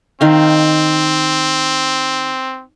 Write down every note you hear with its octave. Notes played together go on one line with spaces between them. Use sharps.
D#3 C4 F5